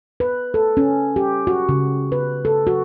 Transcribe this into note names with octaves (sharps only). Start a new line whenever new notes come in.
B4
A4
C#4
G4
F#4
C#3
B4
A4
F#4